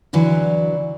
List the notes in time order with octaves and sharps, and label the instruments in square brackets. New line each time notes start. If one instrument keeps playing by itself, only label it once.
[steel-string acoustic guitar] D2 D3 E3 F#3